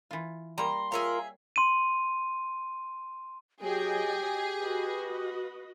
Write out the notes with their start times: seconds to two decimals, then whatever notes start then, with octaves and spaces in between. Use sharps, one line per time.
0.11 E3 F4
0.58 G3 A#3 A#5 C6
0.92 F4 G#4 A#4 C#5 E5 F5 A#5
1.56 C6 D#7
3.62 F#3 G4 G#4 D#5 G5
4.60 F#4 B4 D#5